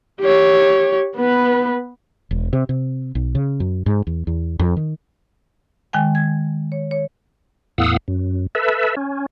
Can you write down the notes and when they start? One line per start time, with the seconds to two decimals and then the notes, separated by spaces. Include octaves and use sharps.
0.20 G4 C#5
1.16 B3 B4
2.31 E1
2.53 C3
2.69 C3
3.15 B1
3.35 C#3
3.60 F#2
3.86 G#2
4.07 E2
4.27 E2
4.59 F2
4.77 D#3
5.93 D#3 G#3 G5 G#5
6.15 G#6
6.72 C#5
6.91 C#5
7.78 E2 A2 F5 F#5 D#6 E6
8.08 F#2
8.55 A4 B4 E5
8.97 C#4